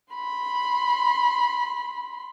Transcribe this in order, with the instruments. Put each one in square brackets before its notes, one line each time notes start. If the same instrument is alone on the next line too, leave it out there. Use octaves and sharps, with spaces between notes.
[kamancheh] B5 C6